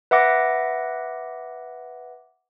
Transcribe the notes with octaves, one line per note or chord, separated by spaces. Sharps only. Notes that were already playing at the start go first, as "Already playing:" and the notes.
B4 E5 F#5 D6 A#6